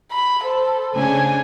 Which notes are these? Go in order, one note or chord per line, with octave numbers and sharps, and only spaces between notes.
B5
A4 C5
C#3 D4 G#5